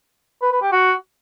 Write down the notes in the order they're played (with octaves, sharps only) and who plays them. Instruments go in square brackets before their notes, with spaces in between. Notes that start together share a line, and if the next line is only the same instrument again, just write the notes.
[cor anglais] B4
B4
G4
F#4